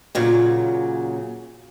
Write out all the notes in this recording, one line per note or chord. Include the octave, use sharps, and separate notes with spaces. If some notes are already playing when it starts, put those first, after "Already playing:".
A#2 C#3 F#3